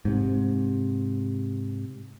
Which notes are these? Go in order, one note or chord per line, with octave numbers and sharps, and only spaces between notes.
G#2 C3